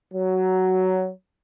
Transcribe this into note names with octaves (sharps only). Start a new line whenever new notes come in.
F#3